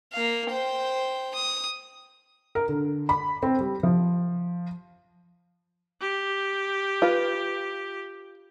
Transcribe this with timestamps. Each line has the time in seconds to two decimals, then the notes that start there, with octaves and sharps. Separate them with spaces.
0.13 A#3 F5
0.50 C5 G5
1.35 D#6
2.55 A#4
2.68 D3
3.09 B5
3.43 C4
3.60 G3
3.83 F3
6.01 G4
7.02 F4 B4